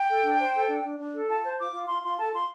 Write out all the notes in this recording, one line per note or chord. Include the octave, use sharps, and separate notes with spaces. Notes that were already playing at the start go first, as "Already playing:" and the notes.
Already playing: G5
A4
D4
C5
A4
D4
D4
D4
A4
F4 A5
C5
F4 D6
F4
F4 C6
F4 C6
A4 A5
F4 C6